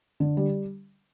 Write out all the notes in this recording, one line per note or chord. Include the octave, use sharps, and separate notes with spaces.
D3
G3